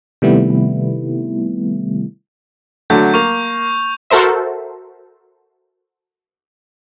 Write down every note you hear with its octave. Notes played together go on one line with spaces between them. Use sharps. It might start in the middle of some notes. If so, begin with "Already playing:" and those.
C3 D#3 G3 A3 B3 E4
D3 F#3 A3 G6
A#3 C#6 F7
F#4 A4 A#4 C5 E5